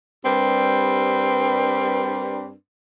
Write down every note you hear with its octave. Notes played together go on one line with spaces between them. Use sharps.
G2 G3 C4 D4 A#4 B4